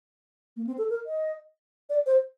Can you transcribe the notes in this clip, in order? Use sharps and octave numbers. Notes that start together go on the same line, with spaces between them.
A#3
C4
A4
A#4
D#5
D5
C5